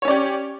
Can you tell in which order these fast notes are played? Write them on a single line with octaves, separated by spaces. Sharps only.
C#5 C#4 D5 G4